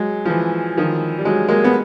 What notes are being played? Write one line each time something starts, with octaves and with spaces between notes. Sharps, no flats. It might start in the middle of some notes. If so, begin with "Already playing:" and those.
Already playing: F#3 G#3
F3
E3
D#3 F3
G3
F#3 G#3
G#3 A#3
B3